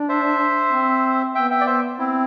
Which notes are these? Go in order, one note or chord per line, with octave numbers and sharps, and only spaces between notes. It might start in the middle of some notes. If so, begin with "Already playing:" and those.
Already playing: D4
C5 E5
C4
B3 E5 G5
E5 G5
D5
C5 E5
C4 E4